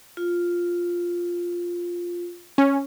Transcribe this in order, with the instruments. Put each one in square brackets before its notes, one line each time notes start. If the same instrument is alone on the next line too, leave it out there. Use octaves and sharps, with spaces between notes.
[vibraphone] F4
[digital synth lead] C#4